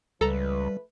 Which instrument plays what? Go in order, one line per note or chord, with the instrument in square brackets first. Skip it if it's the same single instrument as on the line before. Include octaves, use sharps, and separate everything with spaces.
[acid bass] C#2 [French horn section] F3 A3 B4 [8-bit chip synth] G3 [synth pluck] A4 A#5